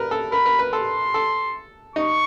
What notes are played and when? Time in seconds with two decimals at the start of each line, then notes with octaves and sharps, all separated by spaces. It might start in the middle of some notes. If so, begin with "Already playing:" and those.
Already playing: A#4 B4
0.11 A4
0.32 A#4 B5
0.46 A#4
0.59 B4
0.73 A4 C6
1.14 A4
1.96 D#4 C#6